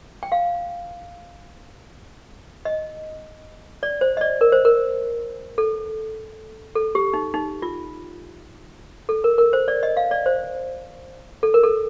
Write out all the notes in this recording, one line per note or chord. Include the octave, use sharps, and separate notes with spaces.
G5
F5
D#5
D5
C5
D#5
D5
A#4
C5
A#4
A4
A4
G4
D#4
D#4
F4
A4
A#4
A#4
C5
D5
D#5
F5
D5
C5
A4
A#4
A4